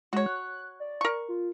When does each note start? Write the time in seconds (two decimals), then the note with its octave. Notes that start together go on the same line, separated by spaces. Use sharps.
0.13 G#3 F#4 C#5
0.26 F#6
0.80 D5
1.01 A#4 C#6
1.29 F4